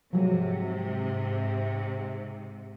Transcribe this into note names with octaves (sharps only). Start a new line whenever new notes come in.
G#2 C3 F3 F#3 G#3